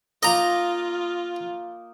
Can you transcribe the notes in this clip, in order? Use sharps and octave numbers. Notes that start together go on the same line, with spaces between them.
A#3 D#4 F4 A#4 D#5 A#5